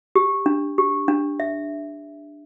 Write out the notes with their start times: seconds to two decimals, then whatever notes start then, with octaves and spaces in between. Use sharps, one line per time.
0.16 G4
0.46 D4
0.78 G4
1.08 D4
1.40 E5